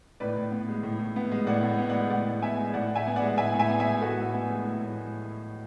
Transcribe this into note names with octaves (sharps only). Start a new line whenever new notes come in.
A2 B4 D5
A2
B3
G#3
A2
A2
B3
G#3
A2 D5 F#5
A2
B3
D5 F#5
G#3
A2 D5 F#5
A2
B3 E5 G#5
G#3
A2 D5 F#5
A2
E5 G#5
B3
D5 F#5
G#3
A2 E5 G#5
A2
E5 G#5
B3
E5 G#5
G#3
A2 F#4 A4
A2
B3
G#3
A2
A2